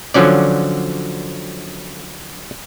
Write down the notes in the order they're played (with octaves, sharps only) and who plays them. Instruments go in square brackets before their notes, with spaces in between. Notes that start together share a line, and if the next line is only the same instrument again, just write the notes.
[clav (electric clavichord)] D3 F3 F#3 C#4 D5